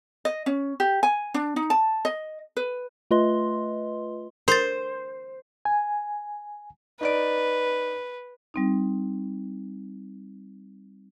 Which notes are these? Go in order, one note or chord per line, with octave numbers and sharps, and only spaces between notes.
D#5
C#4
G4
G#5
D4
D#4
A5
D#5
B4
A3 F4 B4 D#5 C6
A#4 C5 A6
G#5
D#4 B4 D5 D7
G3 C4 D#4